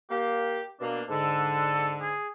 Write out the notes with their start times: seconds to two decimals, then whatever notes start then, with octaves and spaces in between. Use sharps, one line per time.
0.11 A#3 G4
0.80 B2 A#3 D4
1.09 G#2 D3 A4
2.02 G#4